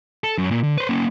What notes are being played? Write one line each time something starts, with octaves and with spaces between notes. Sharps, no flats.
A4
F#2
A#2
D3
B4 C5
A#3 C#4